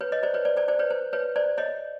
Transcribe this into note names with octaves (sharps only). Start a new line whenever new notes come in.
B4 C#5
C#5 D#5
C5 D5
B4 C#5
C5 D5
C5 D5
C5 D5
B4 C#5
C5
B4 C#5
C5 D5
C#5 D#5